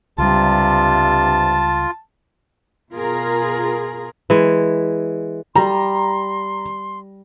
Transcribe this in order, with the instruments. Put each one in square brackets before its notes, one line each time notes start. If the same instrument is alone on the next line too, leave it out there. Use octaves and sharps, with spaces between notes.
[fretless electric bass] C#2 G3 [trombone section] G2 C3 [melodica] F4 [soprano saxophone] A5
[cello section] B2 F4 G#4 A#4
[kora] E3 G#3
[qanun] G3 [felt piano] A#5 [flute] C6